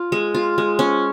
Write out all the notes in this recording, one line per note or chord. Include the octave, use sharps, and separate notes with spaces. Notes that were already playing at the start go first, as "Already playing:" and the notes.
Already playing: F4
G#3
F4
G#3
C#4